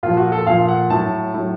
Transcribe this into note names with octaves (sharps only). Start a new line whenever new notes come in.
A#2 F3 F4
F#4
A4
A#2 F3 F5
F#5
A2 F#3 A5
A2 F#3